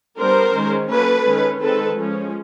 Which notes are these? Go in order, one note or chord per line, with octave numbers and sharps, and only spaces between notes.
G3 B3 D4 A#4 C5
D#3 G#3 C#4
F#3 A#3 C#4 A4 B4
D#3 G#3 C#4
D#3 G#3 C4 A4 B4
F3 G#3 C#4